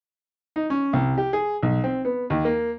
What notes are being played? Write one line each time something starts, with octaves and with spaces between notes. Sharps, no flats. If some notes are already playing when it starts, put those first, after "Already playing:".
D#4
C#4
C2
G4
G#4
B1
C4
B3
D#2
A#3